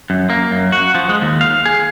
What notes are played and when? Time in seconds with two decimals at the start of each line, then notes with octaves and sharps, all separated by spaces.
0.10 F#2
0.30 A#3
0.52 F#2
0.72 F#4
0.95 F3
1.09 G#3
1.22 D#2
1.41 F5
1.66 G#4